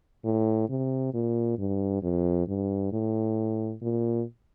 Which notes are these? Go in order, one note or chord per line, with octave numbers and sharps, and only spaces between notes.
A2
C3
A#2
G2
F2
G2
A2
A#2